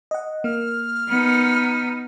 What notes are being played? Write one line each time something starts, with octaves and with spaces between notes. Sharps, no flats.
D#5 F#5
A#3 F6
B3 D#4